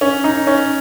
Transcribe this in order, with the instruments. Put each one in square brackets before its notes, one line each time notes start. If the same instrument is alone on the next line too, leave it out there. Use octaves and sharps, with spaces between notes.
[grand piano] C#4
D#4
C#4